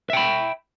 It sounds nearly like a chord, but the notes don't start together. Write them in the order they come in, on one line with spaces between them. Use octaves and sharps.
E5 G5 B5